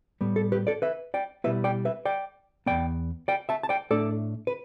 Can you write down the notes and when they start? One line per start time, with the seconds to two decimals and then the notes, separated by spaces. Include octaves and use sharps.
0.21 A2 G3 B3
0.36 A4
0.52 G4 B4
0.67 A4 D5
0.82 B4 E5
1.14 D5 G5
1.44 B2 G3 B3 E4 B4 E5
1.64 D5 G5
1.85 B4 E5
2.05 D5 G5
2.66 E2 B2 B3 D5 G5
3.28 D5 G5
3.49 E5 A5
3.63 A5
3.69 D5 G5
3.90 A2 A3 D4 A4 D5
4.47 B4